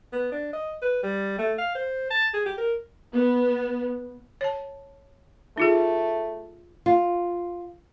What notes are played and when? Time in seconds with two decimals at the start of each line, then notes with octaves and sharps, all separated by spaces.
0.12 B3
0.32 D4
0.53 D#5
0.82 B4
1.03 G3
1.38 A3
1.58 F5
1.75 C5
2.10 A5
2.34 G#4
2.45 G4
2.57 A#4
3.14 B3
4.41 C#5 A5
5.58 A3 D#4 F4 G#4
6.86 F4